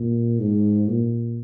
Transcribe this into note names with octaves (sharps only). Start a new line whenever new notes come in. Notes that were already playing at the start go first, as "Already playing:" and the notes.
Already playing: A#2
G#2
A#2